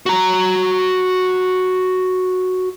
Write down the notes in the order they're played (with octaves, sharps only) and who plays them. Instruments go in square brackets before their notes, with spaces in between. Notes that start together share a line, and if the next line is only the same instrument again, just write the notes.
[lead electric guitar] F#4 A#5